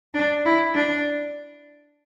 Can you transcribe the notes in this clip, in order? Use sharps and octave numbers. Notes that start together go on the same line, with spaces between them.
D4
E4
D4